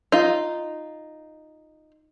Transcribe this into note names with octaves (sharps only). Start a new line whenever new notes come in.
D#4 F4